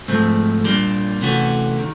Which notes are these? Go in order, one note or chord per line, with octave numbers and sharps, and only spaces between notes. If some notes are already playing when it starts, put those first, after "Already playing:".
G#2 F3 A3 C4
A#2 G3 A#3 D4
C3 E3 A3 C#4 F#4
D#3